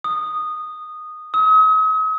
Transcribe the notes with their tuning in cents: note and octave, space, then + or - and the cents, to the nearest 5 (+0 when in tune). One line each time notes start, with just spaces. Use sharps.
D#6 -10
D#6 +45